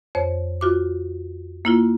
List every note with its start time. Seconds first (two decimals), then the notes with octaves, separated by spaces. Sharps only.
0.15 F2 C5 C#5
0.61 F4 F#4 D6
1.65 A#3 E4 F4